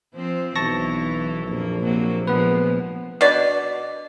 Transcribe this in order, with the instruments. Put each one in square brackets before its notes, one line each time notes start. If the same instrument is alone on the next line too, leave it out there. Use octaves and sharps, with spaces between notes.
[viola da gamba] F3 C4
[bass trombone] B1 [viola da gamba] E3 [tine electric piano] A5 C#6 A#6
[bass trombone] A#1 [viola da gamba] F2 A#3
[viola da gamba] C3 F#3 A#3
[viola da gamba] A#2 F3 G#3 [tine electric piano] B3 B4
[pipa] B2 D4 D5